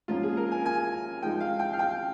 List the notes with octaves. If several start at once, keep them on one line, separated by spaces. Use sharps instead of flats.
G#2 F3 A#3 C#4 F4
G#4
A#4
G#5
G#5
G#2 F3 G#3 D#4 G5
F5
G5
F5
G5